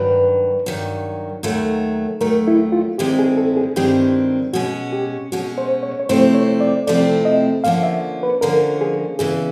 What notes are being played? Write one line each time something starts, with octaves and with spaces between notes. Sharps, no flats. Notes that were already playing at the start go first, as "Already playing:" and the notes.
Already playing: G2 D#3 F#3 B4
G2 D#3 F#3
D#2 D#3 F#3 A3
D#2 D#3 F#3 A3 A#4
E4
F4
G2 D#3 G#3 C4 E4 G4
G#4
A4
G#4
G2 D#3 G#3 C4 E4 G4
B2 G#3 C#4 F#4
G4
B2 G#3 C#4 F#4
C5
C#5
C#5
C3 F3 A3 C4 E4 C5
C#5
D5
C3 F3 A3 C4 E4 D5
D#5
D3 F3 A#3 C#4 F5
E5
B4
D3 F3 A#3 C#4 A#4
G#4
E2 C#3 E3 G#4